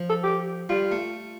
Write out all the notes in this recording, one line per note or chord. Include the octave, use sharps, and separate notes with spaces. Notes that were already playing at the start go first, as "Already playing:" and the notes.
Already playing: F3
A4
G4
G3 F4
A3